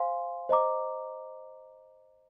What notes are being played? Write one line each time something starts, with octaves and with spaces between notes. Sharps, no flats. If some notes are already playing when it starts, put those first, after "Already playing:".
Already playing: C5 F5 G#5 C6
C5 D#5 A#5 D6